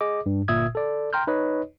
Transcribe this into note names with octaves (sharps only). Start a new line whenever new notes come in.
G#4 D#5 D6
G2
G1 A#2 E5 D#6 E6 G#6
A4 D5
G5 A#5 C6 F6 G6
D#4 B4 C#5 D#5